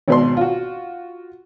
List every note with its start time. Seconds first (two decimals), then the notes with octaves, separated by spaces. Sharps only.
0.08 G#1 B2 B4 D5 C6
0.37 F4 F#4